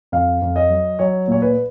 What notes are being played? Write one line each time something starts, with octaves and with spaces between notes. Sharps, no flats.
F2 F5
F2
D#5
F#3
F#3 C#5
A#2 C#5
B4